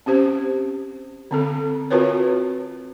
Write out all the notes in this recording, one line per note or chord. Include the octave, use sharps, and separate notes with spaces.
C4 C#4 G4 C5
D3 C4 A4
C4 F4 F#4 A#4 B4 C#5